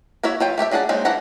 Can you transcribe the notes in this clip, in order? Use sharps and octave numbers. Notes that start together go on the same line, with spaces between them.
A#3 E4 F#4 C#5 E5
F#3 F4 G5
A3 G4 A4 E5
F#3 D4 G#4 F#5 A5
F#3 G#3 A#3 C4 D#4
E3 D4 E4 F#5 A#5